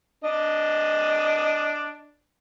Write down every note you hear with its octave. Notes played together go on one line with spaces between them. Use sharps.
D4 D#5